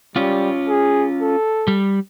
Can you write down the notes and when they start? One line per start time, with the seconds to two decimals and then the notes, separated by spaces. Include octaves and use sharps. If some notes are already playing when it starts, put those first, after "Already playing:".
0.16 G3 C#4 F4
0.69 G#4
1.21 A4
1.68 G3